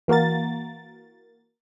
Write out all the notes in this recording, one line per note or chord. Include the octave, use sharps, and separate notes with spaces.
E3 A#3 F#4 A#4 A6